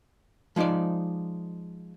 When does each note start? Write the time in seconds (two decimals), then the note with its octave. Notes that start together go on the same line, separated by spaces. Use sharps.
0.56 F3 G#3 D#4 C5 D5